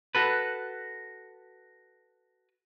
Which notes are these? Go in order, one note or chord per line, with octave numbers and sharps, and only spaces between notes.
F#4 A4 B4